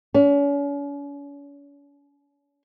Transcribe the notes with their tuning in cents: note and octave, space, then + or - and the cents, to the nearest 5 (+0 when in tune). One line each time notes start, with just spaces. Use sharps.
C#4 +40